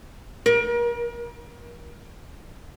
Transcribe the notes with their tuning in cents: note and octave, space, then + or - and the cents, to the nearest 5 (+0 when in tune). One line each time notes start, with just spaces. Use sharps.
A#4 +40